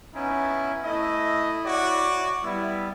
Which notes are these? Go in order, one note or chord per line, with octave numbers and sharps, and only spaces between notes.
B3 C#4 D#4 E4
A3 E4 D#5
F#4 C#5 D5
G3 B3 E4